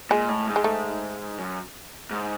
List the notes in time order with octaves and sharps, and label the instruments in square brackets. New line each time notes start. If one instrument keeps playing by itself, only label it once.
[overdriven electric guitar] A#2 [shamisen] G#3
[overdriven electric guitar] A2
G#2
[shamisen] G#3
A3
[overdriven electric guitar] F#2
G#2